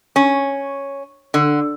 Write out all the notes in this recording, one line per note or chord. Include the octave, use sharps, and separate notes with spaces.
C#4
D3